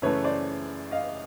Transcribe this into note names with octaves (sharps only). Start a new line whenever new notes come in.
F#2 C#3 E3 A3 B4 C#5
C5 D5
D#5 F5